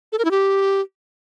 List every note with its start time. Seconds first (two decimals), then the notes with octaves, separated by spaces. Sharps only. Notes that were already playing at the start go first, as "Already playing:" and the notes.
0.12 A4
0.19 A#4
0.25 E4
0.31 G4